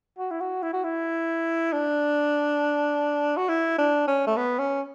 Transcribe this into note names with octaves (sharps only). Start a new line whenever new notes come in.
F#4
E4
F#4
E4
F#4
E4
D4
F#4
E4
D4
C#4
A3
B3
C#4